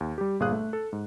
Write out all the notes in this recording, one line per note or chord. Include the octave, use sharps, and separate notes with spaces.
D#2
G3 G4
G1 A#2 G#4 F5 D#6 F#6
A3
A4
G#2